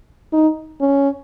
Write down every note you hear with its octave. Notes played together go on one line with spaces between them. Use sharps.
D#4
C#4